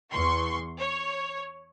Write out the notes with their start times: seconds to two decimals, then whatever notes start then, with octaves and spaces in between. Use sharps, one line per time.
0.12 E2 C6 C#6
0.79 C#5